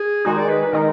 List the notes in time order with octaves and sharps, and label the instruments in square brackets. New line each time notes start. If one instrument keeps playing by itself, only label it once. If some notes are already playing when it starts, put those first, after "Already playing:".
Already playing: [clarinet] G#4
[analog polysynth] D#3 G#3 D#4 [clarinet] F#4
[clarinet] D5
B4
B4
[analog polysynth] D#3 G#3 D#4 [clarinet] A#4